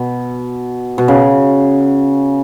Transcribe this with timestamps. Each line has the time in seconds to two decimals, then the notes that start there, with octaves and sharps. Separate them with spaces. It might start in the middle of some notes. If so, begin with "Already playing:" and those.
Already playing: B2
0.98 B2
1.08 C#3